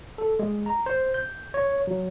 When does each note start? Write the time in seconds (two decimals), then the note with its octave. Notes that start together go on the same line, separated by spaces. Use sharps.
0.18 A4
0.39 G#3
0.66 A#5
0.86 C5
1.14 G6
1.54 C#5
1.87 F#3